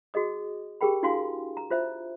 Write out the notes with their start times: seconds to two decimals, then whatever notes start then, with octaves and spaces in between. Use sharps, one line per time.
0.14 F#4 G#4 D#5 D#6
0.81 G4 G#4 A#4 G5 B5
1.03 D4 E4 F#4 F5 G#5 C6
1.57 A#5
1.70 F4 C5 E5